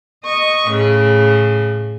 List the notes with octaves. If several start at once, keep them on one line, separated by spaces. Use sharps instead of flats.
D#5 C#6
A2 C#3